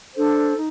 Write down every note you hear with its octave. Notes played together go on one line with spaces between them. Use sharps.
D4 A4 C5
D#4